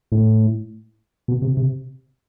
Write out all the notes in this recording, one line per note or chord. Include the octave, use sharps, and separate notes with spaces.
A2
B2
C3
C3